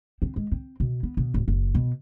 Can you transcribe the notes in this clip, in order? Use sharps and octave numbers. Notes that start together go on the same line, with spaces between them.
C4
G#3
C4
B2
B3
B2
D1
F#1
B2